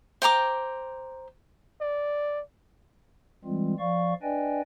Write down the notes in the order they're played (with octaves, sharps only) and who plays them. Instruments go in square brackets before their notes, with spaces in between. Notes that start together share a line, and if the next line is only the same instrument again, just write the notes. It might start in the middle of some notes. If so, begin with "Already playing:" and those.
[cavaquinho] C5 G5 A#5 D6
[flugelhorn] D5
[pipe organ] E3 G3 G#3 C4 F4
F3 D5 F5 C#6
D4 B4 D5 D#5 G5 G#5